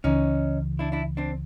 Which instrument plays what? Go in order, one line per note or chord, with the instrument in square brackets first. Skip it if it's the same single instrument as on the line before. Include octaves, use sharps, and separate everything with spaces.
[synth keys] C#2 C#3 E3 [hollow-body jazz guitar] C#4 D#4
[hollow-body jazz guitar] D4 E4
D4 E4
C4 D4